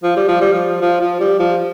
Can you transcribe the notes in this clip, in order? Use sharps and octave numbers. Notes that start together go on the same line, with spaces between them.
F3
G3
F3
G3
F3
F3
F3
G3
F3